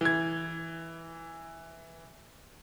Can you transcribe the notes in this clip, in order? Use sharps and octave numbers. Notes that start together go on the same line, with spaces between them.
E3 G#6